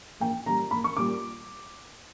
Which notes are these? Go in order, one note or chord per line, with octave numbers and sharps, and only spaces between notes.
A#1 G5
A#2 G3 A#5
A#1 B5
C#6
A#2 G3 D6